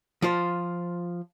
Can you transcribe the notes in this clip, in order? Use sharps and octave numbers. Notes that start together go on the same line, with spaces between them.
F3 F4 C5